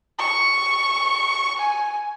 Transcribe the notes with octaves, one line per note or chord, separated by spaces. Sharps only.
C#6
G#5